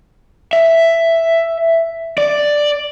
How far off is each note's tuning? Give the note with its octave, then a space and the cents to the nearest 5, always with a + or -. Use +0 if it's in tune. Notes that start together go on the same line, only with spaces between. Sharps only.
E5 +5
D5 +5